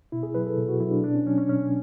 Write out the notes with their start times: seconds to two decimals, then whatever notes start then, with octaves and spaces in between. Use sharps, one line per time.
0.12 B2 E4
0.23 G#4
0.35 F#3 B4
0.47 A4
0.57 B2
0.69 F#4
0.80 F#3 E4
0.91 D4
1.04 B2 D4
1.15 C#4
1.26 F#3 C#4
1.38 C#4
1.48 B2 C#4